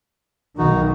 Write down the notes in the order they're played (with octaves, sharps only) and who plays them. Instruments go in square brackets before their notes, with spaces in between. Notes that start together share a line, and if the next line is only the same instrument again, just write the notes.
[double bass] B1 [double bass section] D#3 [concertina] D#4 F#4